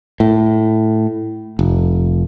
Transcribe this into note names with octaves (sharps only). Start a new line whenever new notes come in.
A2
F1